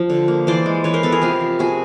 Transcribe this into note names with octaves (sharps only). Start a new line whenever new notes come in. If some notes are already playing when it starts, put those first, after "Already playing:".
Already playing: F3
D3
A#3
E3 C5 D5
G#3
E3 B4 C#5
A#4 C5
B3 A4 B4
G#4 A#4
C3 F4 G4
F3
C3 F#4 G#4